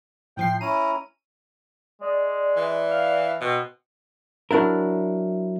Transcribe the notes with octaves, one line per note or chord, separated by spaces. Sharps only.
A2 F3 G5 C7
C#4 E4 A#5 D#7
G#3 D5
E3
F5
B2 C4
F#3 D4 E4 A#4